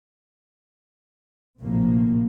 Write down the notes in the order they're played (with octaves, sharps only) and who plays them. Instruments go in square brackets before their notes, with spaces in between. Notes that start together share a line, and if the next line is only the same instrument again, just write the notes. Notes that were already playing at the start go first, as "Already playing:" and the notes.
[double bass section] A#1 A2 C3 F3 A#3